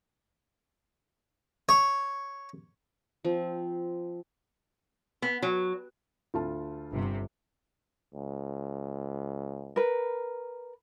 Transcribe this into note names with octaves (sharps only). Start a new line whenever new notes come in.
C#5
F3 C4
B3
F#3
D2 F4 A5
G1 C3
C#2
A#4 B4